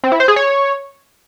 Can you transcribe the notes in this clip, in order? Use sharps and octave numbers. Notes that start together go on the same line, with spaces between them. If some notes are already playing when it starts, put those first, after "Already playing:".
C4
E4
C5
G#4
C#5